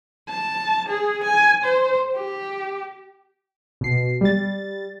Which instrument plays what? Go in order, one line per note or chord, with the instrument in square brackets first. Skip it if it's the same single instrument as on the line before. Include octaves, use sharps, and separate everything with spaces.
[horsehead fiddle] A5
G#4
G#5
C5
G4
[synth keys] B2 C7
G3 A6